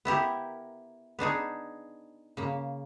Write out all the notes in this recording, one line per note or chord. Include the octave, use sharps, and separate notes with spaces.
B3 E4 G4 A#4
B3 D4 D#4 G#4
C#3 A#3